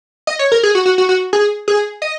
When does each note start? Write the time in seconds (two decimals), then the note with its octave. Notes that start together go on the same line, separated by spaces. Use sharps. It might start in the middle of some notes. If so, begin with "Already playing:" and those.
0.27 D#5
0.39 C#5
0.52 A#4
0.63 G#4
0.75 F#4
0.86 F#4
0.98 F#4
1.09 F#4
1.33 G#4
1.68 G#4
2.02 D#5